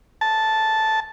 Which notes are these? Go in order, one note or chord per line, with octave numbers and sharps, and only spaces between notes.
A5